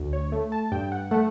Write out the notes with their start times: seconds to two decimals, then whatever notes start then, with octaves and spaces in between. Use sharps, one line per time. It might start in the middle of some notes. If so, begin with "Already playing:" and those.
Already playing: D2
0.13 C#5
0.32 A3
0.52 A5
0.72 G2 G5
0.92 F#5
1.11 A3 F#5